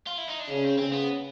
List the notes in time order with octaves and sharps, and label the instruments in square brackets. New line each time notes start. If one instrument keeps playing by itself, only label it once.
[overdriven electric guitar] F4
E4
D#4
D4
[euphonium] C#3 [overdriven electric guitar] C#4
[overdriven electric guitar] C4
[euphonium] C#3 [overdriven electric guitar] C4
[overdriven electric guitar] B3